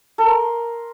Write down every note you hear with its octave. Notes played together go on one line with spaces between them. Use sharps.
A4
A#4
C6